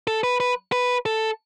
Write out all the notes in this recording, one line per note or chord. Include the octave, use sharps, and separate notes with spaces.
A4
B4
B4
B4
A4